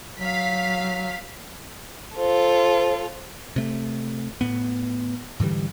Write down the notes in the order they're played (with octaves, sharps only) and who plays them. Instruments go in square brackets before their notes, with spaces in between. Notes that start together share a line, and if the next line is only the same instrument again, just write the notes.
[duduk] F#3 [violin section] F5 B6
[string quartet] F4 A4 [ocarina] C5
[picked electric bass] C3 A3
A2 B3
G#2 D3 E3 G3